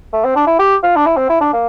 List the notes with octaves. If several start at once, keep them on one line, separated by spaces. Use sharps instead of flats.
A3
C4
D4
E4
G4
F4
D4
E4
C4
E4
D4
A#3